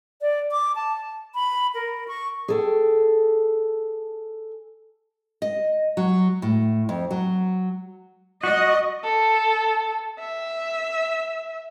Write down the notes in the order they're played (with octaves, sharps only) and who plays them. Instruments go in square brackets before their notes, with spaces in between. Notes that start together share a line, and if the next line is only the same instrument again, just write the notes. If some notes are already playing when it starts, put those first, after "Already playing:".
[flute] D5
D6
A5
B5
A#4
C#6
[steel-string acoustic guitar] G#4 A4 G5
[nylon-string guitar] D#5
F#3
A2
F2
F#3
[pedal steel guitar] F#4 [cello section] D#5
[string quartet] A4
E5